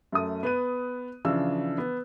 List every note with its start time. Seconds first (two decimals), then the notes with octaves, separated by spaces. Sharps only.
0.12 F#2 A3 D#6
0.43 B3 B4 D#7
1.25 C#3 E3 F3 D4 E6
1.78 B3